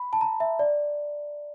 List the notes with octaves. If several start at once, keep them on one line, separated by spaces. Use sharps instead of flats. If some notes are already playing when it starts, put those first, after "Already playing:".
Already playing: B5
A5
A#5
E5
D5